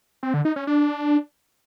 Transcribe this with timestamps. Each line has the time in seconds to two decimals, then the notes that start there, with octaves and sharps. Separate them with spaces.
0.23 C4
0.34 D3
0.45 D#4
0.56 C#4
0.67 D4